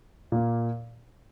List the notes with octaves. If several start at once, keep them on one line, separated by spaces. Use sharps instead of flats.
A#2 A#3